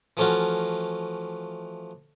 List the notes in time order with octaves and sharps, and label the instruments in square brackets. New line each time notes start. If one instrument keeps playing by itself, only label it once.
[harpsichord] E3 F3 A3 C#4 F4 F#4